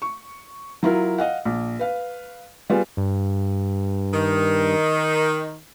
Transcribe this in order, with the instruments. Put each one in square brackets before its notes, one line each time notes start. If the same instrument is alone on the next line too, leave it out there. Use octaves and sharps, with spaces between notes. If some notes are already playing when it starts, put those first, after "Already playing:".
[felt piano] C#6
F#3 E4 F4 A#4
D#5 F5 F#5
A#1
B4 F5
G3 B3 F4 G#4
[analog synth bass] G2
[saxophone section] D#3